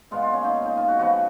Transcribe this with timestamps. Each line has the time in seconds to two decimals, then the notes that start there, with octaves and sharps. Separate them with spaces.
0.11 A#2 G#3 B3 F4
0.22 F4
0.33 C#4
0.44 D#4
0.66 D#4
0.78 F4
0.88 F#4
0.99 C#3 F3 B3 F#4